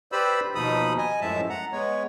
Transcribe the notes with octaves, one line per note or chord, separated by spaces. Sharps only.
G4 B4 C5 D5 B5 E6
D#2 B2 F3 D#4 B5 D#6
D#5 G#5
F#2 A2 F3 G#3 E5 A5
F#5 A#5
G#3 B3 C#5